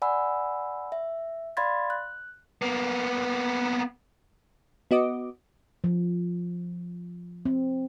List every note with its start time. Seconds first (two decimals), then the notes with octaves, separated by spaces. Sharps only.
0.02 D5 F#5 G#5 B5 E6
0.92 E5
1.57 D5 F5 B5 C6 G#6 A6
1.90 F#6
2.62 A#3 B3
4.91 B3 F#4 D#5 D6
5.84 F3
7.45 C4